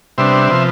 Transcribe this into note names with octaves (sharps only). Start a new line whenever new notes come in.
C3 G3 B3 D4 C5 E5
C3 F3 B3